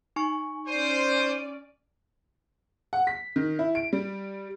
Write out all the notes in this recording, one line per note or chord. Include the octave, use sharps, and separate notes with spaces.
D#4 G#5 C#6
C#4 C5 D5 D#7
F#5
B6
D#3
E4
D7
G3